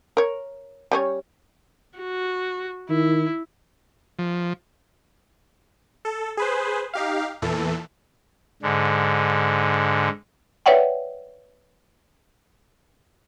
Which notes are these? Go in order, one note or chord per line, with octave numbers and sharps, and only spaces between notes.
A#4 C#5
G3 C#4 C#5
F#4
D#3 E4
F3
A4
G#4 B4 C5
D#4 G4 F5
E2 A#2 E3 A4
G#2 D3
B4 C#5 D5 E5 F#5 G5